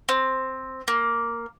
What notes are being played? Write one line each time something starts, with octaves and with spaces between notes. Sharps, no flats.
C4
A#3